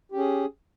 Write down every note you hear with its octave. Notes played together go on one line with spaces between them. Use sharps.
C#4 G4 G#4